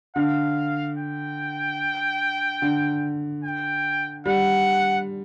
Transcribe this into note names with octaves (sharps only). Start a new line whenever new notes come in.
D3 F5
G5
D3
G5
G3 F#5